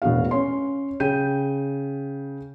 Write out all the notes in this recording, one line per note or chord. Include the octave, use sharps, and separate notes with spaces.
E1 A1 B3 D4 F#4 F5
C#4 C#5 C6
C#3 G5 G6 D#7